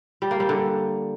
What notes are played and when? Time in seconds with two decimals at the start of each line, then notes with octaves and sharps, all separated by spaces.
0.22 G3
0.31 A#3
0.40 G3
0.49 D3